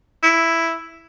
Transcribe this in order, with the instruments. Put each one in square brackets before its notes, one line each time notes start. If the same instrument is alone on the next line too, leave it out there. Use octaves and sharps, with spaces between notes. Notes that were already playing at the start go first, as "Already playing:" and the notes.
[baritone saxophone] E4